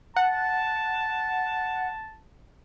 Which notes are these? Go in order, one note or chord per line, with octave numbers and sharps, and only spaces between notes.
F#5 A5